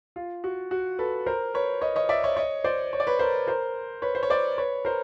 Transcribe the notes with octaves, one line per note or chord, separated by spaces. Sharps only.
F4
F#4
F#4
A4 B4
A#4 C5
B4 C#5
C#5 D#5
C#5 D#5
D5 E5
C#5 D#5
C#5 D#5
C5 D5
C#5
D5
B4 C#5
A#4 C5
A#4 C5
B4 C#5
C5
C#5
C5 D5
B4 C#5
A#4 C5